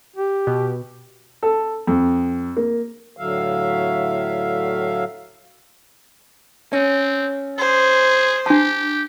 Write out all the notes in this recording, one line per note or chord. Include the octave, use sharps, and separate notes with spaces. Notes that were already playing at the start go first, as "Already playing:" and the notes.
G4
B2
A4
F2
A#3
A2 D3 F#3 E5 F5
C4 C#4
G#4 C5
D4 G4 A5